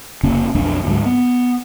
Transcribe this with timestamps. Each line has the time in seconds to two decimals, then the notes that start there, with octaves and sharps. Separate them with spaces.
0.23 F1 C#3 A#3 C#4
0.55 B1 F2 A3 D4
0.85 D2 G#2 F#3
1.06 B3